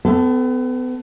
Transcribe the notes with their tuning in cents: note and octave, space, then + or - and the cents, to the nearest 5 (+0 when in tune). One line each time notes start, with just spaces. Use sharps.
B3 +35 A4 +0 G5 +0